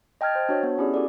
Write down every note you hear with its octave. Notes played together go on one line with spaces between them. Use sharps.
D#5 G5 A5 F6 G#6 A6
C5
D4 F#4 C#5
B3
C#4 E4 G4 G#4 D5
F#4 A4 D5